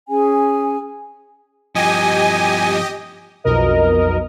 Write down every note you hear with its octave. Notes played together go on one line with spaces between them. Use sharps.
C#4 G#4 G#5
G2 F3 G4 D#5 G#5
B1 F2 B2 A#4 D#5